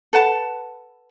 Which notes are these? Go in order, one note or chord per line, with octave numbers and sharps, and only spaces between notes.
A4 B4 F#5 A5